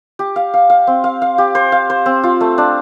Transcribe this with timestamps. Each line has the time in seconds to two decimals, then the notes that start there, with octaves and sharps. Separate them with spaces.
0.19 G4
0.36 F5
0.54 F5
0.70 F5
0.87 C4
1.04 F5
1.22 F5
1.38 G4
1.55 C5
1.72 F5
1.90 C5
2.06 C4
2.23 F4
2.41 A3
2.58 D4